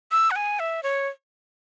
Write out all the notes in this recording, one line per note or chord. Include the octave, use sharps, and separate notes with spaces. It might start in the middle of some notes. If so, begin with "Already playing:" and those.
E6
F#5
G#5
E5
C#5